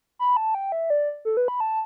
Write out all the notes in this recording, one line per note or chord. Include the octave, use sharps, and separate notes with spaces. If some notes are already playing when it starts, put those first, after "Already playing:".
B5
A5
G5
E5
D5
A4
B4
B5
A5